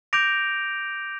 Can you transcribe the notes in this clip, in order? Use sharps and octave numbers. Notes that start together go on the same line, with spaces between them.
D6 G6 A#6 D7 F7